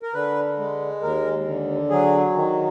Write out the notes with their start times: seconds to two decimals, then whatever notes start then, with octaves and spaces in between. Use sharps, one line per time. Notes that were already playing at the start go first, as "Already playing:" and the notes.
0.03 A#4
0.14 D3 B4
0.59 G#3
1.02 D#2 A#4
1.47 D3
1.90 F#3 G#4
2.35 D#3